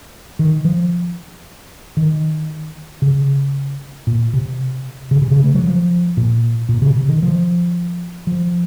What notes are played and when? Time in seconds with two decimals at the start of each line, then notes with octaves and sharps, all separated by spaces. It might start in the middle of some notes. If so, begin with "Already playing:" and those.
0.39 D#3
0.65 F3
1.97 D#3
3.02 C#3
4.07 A#2
4.33 C3
5.11 C#3
5.22 C3
5.31 C#3
5.44 A3
5.54 F#3
5.64 F3
6.17 A#2
6.69 A#2
6.82 C#3
6.96 C3
7.08 D#3
7.22 F3
8.27 F3